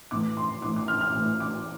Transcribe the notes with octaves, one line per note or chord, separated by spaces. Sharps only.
A2 E3 A3 D6
C6
A2 E3 A3 D6
D6
F6
F6
A2 E3 A3
D6